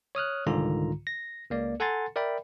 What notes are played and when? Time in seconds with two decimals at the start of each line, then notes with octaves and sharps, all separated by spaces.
0.15 C#5 D#6 F6 F#6
0.46 C2 G#2 D3 D#3 F4 A#5
1.07 A#6
1.50 C#2 A#3 D5
1.80 A4 F#5 G#5 A#5 C6 A6
2.16 A#4 D5 E5 G5 B5